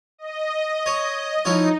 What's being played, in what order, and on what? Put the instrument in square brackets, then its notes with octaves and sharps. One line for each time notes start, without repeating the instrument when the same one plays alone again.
[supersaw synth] D#5
[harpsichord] C#5
[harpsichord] F3 E4 C#5 [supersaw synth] D#4